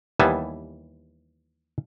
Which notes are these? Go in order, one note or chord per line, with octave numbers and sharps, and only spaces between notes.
D#2 E3 G3 B3 G#5 A5